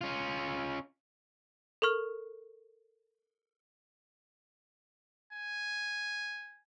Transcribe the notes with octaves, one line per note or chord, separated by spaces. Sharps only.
C#4 F4
A4 A#4 C#6 F6
G#5